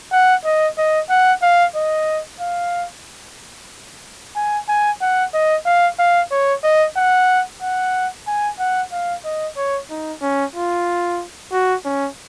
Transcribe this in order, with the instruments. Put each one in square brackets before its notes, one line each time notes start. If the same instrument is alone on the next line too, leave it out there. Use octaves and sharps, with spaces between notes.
[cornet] F#5
D#5
D#5
F#5
F5
D#5
F5
G#5
G#5
F#5
D#5
F5
F5
C#5
D#5
F#5
F#5
G#5
F#5
F5
D#5
C#5
D#4
C#4
F4
F#4
C#4